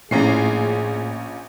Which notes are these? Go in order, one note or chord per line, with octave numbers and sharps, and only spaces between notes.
A#1 A2 C#4 G#4 C7